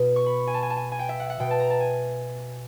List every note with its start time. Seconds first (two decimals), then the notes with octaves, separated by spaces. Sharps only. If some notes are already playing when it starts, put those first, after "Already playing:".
Already playing: B2
0.16 C#6
0.26 B5
0.47 G#5
0.54 A5
0.63 G#5
0.70 A5
0.77 G#5
0.92 G#5
0.99 G5
1.09 E5
1.20 F#5
1.30 F#5
1.40 B2 G5
1.51 A5
1.60 A#5
1.70 A5
1.80 G#5